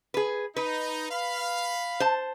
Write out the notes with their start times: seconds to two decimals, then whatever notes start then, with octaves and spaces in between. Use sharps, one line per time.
0.14 G#4 B4
0.56 D#4 B4
1.11 F5 B5
2.00 C5 A5